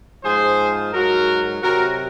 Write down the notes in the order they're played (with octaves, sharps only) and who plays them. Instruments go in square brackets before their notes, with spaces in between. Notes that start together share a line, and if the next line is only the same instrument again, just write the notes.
[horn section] G#2 F3 G#4 C5
G#2 F#3 F#4 A#4
C3 F#3 F#4 A#4